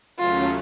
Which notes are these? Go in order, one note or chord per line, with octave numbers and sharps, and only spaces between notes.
D#2 C#3 F#3 A3 C#4 F4